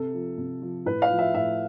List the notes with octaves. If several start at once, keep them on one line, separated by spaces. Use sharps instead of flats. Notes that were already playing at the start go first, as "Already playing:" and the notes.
Already playing: C3 A4
F3
C3
F3
A2 B4
F5
F3
E5
A2 E5